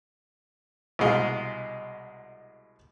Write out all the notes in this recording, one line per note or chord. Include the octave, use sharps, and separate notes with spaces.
C2 B2 G#3 F5